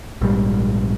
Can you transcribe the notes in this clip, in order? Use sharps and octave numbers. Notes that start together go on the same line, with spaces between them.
A#1 G#2 G3